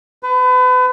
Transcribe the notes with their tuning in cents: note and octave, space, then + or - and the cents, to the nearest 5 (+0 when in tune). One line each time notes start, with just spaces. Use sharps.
B4 +35